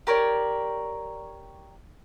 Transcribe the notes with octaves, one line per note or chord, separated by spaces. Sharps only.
G4 A#4 C#5 D5